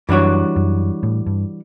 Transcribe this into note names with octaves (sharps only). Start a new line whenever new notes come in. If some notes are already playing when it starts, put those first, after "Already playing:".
F#2 E3 G3 D4 F#4 C#5
F#2
A2
G2